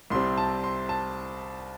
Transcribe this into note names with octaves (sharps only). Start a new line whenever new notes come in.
C2 C3 G3 C4 C6
A5
C6
A5